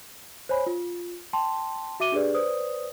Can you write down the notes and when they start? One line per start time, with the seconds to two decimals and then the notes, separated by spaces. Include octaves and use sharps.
0.49 C5 C#5 G#5 B5
0.66 F4
1.33 G5 A5 C6
2.00 F#4 E5 D6 D#7 G7
2.12 D4 G4 G#4 B4 D5
2.35 B4 C5 D5 D#6